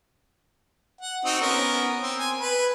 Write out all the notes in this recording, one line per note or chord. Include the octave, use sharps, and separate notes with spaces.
F#5
C4 D#4 F#4
B3 C#4 A#4
C4
G#5
B4